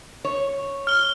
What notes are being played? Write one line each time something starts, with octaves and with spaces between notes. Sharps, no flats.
C#5
F6 G7